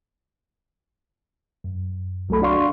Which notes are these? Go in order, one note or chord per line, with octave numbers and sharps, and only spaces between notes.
F#2
C2 F#3 A3 A4 B5
D4 F#4 D5 F5 C6 C#6